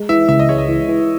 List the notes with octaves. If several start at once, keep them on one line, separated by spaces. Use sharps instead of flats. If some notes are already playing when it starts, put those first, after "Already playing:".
Already playing: G#3
E3 E5
C#2 E5
D#5
G#3 C#5
D#5
E3
E3